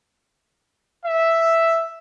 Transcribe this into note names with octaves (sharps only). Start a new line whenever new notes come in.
E5